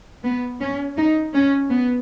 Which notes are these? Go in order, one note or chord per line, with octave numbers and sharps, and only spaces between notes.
B3
C#4
D#4
C#4
B3